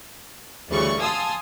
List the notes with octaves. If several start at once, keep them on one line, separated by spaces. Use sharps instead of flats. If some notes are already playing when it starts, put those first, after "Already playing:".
D2 C#3 E3 G3 D5 C#6
F5 G#5 A5 C6 D#6 E6